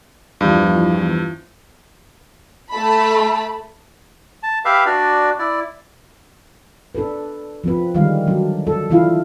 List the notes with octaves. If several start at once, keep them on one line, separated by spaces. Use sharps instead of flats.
E2 G2 E3 F3
A3 A5 B5
A5
G4 B4 E5 F5
D4 F#4 D5
E4 D5
D4 A4 B4
F3 C4 B4
D3 D#3 G3 G#3 F5
F#3 D4
A4
E3 D4 E4 F4 F5